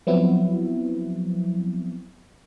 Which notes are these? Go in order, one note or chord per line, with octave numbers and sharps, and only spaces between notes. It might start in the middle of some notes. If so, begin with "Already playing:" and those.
F3 F#3 B3 C4 E4